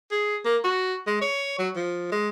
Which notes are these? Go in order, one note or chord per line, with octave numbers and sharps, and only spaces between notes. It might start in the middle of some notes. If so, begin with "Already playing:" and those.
G#4
A#3
F#4
G#3
C#5
F#3
F3
G#3